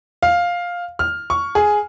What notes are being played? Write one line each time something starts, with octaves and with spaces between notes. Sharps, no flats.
F5
F6
C#6
G#4